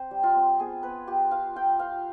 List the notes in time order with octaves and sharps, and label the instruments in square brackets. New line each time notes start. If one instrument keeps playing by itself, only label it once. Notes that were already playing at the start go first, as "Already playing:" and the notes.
Already playing: [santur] C4 C5
G3
F4
C4
B3 G#4
B3 B4
F4 G4
F4 F5
F4 G5
F4 F5